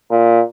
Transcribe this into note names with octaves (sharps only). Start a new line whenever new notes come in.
A#2